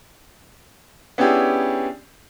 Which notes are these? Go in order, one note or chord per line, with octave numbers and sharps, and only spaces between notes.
B3 C#4 D4 E4 G4 G#4